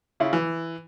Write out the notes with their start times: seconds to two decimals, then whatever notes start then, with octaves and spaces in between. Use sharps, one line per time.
0.20 C#3 E4 F4
0.33 E3